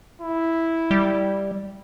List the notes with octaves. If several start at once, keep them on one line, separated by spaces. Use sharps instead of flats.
E4
G3